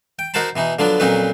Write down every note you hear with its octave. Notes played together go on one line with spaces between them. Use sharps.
G5
D#4 F#4 A#4 C5 A5 B5
B2 E3 D#4
D3 F3 F#3 B3 D4
F2 A#2 F#3 C#4 D#4 B4